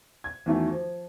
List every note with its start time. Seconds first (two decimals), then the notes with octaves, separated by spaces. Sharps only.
0.24 G#6
0.46 E2 D#3 F#3 A3 C#4
0.71 F3